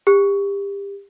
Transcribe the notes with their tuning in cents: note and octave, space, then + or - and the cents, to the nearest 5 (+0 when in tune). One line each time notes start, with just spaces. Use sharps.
G4 +30